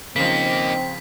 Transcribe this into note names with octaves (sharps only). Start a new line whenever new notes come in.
C#3 F3 A#3 C4 D#4 B6